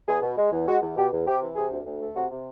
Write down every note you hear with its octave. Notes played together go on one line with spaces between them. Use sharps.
E2 G#4
B2
G#3
E2
G#3 F#4
E2
B2 G4
E2
C3 G4
E3
C3 G#4
D2
D2
A3
C3 F#4
C3